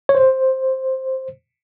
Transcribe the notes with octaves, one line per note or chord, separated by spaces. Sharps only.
C#5
C5